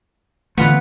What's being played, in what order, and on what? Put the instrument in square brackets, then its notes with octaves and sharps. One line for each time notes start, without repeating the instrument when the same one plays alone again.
[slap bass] D3 E3 A3 [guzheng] B3 F4 B4